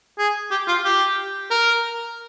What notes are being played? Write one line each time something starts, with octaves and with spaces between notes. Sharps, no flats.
G#4
G4
F4
G4
A#4